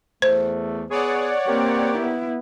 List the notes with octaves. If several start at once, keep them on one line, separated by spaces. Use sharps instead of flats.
E2 A3 C5
B3 G#4 C#5 D5 F#5
A#3 C4 G4 A#4
B3 E4